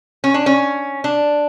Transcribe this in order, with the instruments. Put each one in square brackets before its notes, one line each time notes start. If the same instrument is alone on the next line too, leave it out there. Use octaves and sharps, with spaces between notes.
[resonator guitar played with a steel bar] C#4
D4
C#4
D4